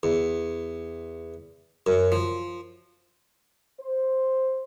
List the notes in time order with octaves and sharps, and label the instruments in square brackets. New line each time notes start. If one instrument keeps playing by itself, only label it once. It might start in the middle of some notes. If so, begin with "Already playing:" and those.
[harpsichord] E2
F#2
F3
[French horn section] C5